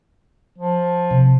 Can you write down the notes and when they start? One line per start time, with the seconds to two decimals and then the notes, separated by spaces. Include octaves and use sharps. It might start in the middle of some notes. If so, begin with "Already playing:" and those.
0.58 F3
1.10 C3